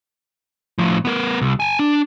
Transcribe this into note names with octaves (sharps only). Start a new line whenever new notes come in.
A2 F3
B3 A#4
C2
G5 G#5
D4